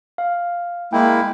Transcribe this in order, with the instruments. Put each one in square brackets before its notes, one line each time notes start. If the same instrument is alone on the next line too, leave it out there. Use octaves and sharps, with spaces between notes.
[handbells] F5
[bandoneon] G#3 A#3 E4 [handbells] G5